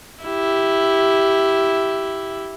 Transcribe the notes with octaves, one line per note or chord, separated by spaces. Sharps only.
E4 G4